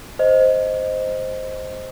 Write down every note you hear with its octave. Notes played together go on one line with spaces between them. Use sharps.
C5 D#5